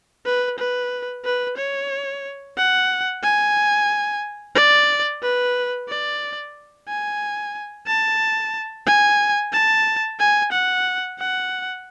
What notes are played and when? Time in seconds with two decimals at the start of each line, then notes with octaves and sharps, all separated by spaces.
0.26 B4
0.59 B4
1.25 B4
1.57 C#5
2.57 F#5
3.23 G#5
4.56 D5
5.23 B4
5.89 D5
6.88 G#5
7.87 A5
8.86 G#5
9.52 A5
10.20 G#5
10.52 F#5
11.19 F#5